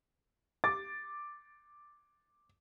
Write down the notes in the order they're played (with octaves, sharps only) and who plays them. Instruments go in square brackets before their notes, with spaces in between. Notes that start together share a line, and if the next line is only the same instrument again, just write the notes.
[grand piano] D6 A6